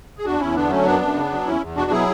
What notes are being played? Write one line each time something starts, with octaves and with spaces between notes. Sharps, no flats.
G#4
E2 D4 F#4
E2 C#4 E4
D3 B3 D4
F#3 A3 C#4
F#2 B3 D4
F#2
C#3
F#3
E2 C#4 E4
E2
B2 D4 F#4
F#3 E4 G#4